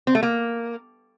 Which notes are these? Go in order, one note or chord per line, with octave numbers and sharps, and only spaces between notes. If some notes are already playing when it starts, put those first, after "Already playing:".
C4
A3
A#3